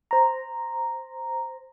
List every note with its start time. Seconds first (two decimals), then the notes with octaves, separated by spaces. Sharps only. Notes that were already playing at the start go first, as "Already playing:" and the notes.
0.11 C5 A#5